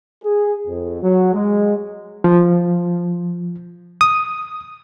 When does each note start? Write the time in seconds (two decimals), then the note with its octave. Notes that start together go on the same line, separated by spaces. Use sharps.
0.24 G#4
0.67 F2
1.02 F#3
1.33 G#3
2.24 F3
4.01 D#6